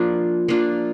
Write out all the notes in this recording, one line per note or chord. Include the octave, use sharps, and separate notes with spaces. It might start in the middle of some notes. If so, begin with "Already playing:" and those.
Already playing: F3 A#3 D4 F4
F3 A#3 D4 F4